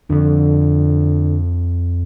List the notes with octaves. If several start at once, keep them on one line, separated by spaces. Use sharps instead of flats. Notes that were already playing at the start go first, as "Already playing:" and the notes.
F2 D3 F3